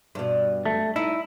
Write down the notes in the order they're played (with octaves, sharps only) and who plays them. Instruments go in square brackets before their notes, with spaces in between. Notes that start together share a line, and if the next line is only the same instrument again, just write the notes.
[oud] G2 B2
[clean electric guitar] A3
[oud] D#4 [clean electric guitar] E4